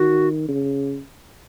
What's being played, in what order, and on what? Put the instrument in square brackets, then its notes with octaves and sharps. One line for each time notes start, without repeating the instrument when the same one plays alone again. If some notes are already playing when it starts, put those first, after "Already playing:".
Already playing: [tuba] D#3 [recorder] F#4
[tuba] C#3